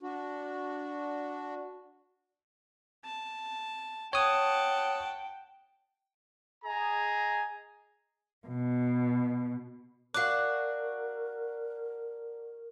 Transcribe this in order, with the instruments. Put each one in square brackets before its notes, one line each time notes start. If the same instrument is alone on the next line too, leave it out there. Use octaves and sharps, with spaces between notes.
[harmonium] D4 F#4
[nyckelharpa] A5
[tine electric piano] C#5 D#6 [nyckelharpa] F#5 A5 [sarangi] G5
[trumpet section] G#4 D#5 G#5 A#5
[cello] B2
[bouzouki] D4 F#4 [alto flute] A#4 [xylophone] F5 D6 [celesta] F#6